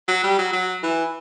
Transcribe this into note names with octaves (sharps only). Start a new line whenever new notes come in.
F#3
G3
F#3
F#3
E3